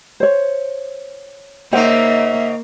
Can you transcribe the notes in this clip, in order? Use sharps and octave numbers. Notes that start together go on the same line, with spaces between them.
C5 C#5
C#3 A#3 D#4 C5 E5 F#5